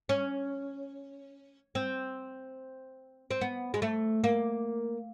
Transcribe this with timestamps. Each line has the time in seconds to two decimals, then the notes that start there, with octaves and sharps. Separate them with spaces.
0.09 C#4
1.75 C4
3.31 C4
3.41 B3
3.74 G#3
3.82 A3
4.24 A#3